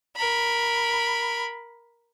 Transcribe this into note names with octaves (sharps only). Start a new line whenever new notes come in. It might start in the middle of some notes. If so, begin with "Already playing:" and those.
A#4 B5